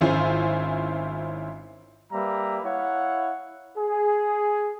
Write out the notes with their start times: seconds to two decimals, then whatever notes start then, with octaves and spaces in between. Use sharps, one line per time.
0.01 G#1 C#4 E4 F4 C5 G#5
2.12 G3 A#3 B4 E5 A#5
2.64 E4 C#5 F5 F#5
3.77 G#4